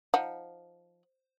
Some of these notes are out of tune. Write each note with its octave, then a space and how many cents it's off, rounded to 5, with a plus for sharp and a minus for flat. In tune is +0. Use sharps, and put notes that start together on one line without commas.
F3 +0 D#4 +0 F#5 +0